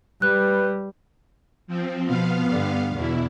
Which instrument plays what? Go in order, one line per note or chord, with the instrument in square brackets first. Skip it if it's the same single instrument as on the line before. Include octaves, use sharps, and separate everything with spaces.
[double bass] G3 [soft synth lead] B4 [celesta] F#6
[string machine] F3 C4
[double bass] B2 F3 [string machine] B3 F5
[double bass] G2 D3
[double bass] E2 [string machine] B2 E4